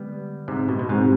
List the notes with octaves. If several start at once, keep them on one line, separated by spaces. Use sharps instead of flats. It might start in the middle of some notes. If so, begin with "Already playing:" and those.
Already playing: D3 G3 G#3 B3
G#2 C3
B2
B2
G#2 G#3 C4 G4 C5